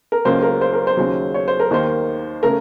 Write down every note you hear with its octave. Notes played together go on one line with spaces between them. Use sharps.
A#4
C#2 C#3 F#3 A#3 C5
A#4
C5
A#4
C5
D#2 C#3 F#3
C#5
C5
A#4
D#2 D#3 A#3 C5
C#3 A3 A#4